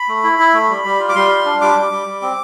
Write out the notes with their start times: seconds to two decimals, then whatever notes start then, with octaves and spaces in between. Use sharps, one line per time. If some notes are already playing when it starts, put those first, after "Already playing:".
Already playing: B5
0.09 A3
0.24 E4
0.39 E4
0.54 A3
0.69 G3
0.84 G3
1.00 F4
1.09 D6
1.15 G3 C6
1.31 F4
1.45 D4
1.61 G3 D6
1.76 G3
1.91 G3
2.06 G3
2.22 C4